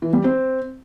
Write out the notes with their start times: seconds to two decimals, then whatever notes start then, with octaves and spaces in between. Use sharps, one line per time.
0.02 E3
0.13 G3
0.24 C4